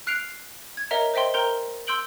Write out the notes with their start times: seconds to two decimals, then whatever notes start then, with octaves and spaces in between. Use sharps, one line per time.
0.07 F6 F#6 C7 D7 F7
0.77 G#6
0.91 A#4 C#5 D#5 E5 F#5 A#5
1.14 C5 D#5 E5 G5 C6
1.34 A#4 G5 A#5 C6 G6 G7
1.87 C6 E6 G6 D7 F#7 G7